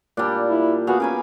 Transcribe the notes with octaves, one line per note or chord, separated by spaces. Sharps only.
A#2 G3 D4
E4
B3 F#4 G#4 F5
C#4 A#4 G#5 B5